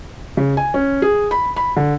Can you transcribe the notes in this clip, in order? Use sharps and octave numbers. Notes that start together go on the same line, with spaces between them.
C#3
G#5
C#4
G#4
B5
B5
D3